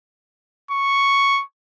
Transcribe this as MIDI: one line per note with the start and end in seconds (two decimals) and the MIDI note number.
0.71 1.42 85